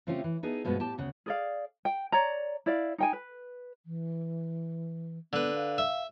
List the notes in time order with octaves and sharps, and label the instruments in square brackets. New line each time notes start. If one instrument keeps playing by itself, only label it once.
[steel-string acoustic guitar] C#3 A3 C4 C#4 F4 G4
E3
B3 D#4 G#4 A4
G2 B2 F3 G#3 B3
A2 G4 A5
D2 C#3 F#5
[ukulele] G#4 D5 F5
G5
C#5 D5 A#5
E4 D5 F5
D#4 G5 G#5
B4
[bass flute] E3
[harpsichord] D3 B4 [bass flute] B3
[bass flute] F5
[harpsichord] E5